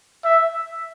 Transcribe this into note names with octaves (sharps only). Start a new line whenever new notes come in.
E5